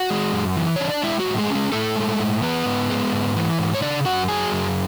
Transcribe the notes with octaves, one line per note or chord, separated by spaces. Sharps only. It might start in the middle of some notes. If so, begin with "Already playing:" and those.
Already playing: F#4 F#5
G#3
F#2
E3
D4 C#5
D5
G#3 E4 E5
F#3 F#4
A2
G#3 G#4
C#4
G#3 G#4
A2 A3 A4
G#3
A2
E3 B3 B4
G#2
G#3
G#2
E3
G#2
C#5
C#3 D4 D5
F#2 F#4 F#5
F#3 G#4 G#5
F#2